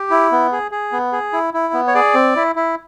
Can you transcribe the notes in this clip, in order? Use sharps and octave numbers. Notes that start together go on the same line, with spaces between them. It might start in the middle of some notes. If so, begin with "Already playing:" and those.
Already playing: G4
E4
B3
G#4
G#4
B3
G#4
E4
E4
B3
C#5
G#4 D5
C4
E4
E4